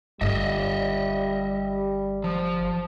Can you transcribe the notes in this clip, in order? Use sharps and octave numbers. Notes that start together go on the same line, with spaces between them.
G1 G3 D#5 E5
F3